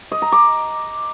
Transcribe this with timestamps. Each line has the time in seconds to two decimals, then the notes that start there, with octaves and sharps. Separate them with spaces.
0.12 D#5
0.22 A#5
0.32 D6